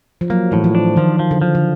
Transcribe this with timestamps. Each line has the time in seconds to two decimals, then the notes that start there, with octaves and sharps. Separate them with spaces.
0.21 F3
0.30 F#3 A#3
0.52 A2 E3
0.64 F3
0.75 D4
0.97 D#3 F3
1.19 F3
1.31 D3
1.41 F3
1.55 D3